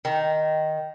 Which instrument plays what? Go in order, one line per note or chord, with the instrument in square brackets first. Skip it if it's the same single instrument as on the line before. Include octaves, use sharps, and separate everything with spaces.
[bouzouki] D#3